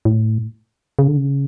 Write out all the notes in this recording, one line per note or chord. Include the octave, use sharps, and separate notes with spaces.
A2
C#3
D3
C#3